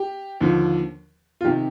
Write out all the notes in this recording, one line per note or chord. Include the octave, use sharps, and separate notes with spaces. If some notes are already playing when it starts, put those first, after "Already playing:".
Already playing: G4
D#2 D3 F3
F4
C3 D#3 G4